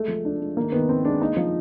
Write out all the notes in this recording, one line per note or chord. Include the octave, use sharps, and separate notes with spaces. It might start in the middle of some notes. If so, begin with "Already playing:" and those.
Already playing: G#3 A3
F3
D4
G#3
D#3 A#3
D#3 B3
B3 C4
G#3 D4
A#3 D#4
F3